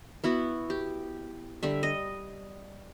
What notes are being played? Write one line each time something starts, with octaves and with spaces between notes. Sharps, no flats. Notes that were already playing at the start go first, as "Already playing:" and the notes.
B3 E4 F#4
G4
D3 G3 E5
D#5